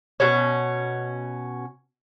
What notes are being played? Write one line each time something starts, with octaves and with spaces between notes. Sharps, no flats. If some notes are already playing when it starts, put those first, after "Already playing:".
B2 C#4